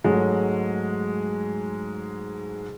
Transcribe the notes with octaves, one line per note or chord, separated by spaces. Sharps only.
G#2 F#3 G#3 A3